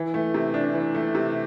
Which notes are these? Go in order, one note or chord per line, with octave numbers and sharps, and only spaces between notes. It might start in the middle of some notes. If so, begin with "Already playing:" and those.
Already playing: E3
A3
C3
D4
E3
A3
C3